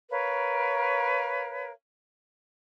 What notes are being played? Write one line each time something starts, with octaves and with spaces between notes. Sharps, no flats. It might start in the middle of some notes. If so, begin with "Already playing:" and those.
A#4 B4 C#5 F5